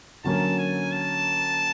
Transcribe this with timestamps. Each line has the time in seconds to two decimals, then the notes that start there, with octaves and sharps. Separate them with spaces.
0.24 D3 F#3 A#3 C#4 A5
0.58 G#5
0.92 A5